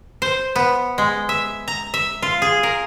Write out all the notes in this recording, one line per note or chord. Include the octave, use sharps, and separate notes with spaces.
C5
B3
G#3
E5
A#5
E5
F4
G#4
A#4